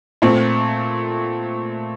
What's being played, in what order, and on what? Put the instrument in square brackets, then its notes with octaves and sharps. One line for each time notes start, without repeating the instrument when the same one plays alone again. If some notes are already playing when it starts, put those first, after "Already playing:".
[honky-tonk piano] A#2 A3 C4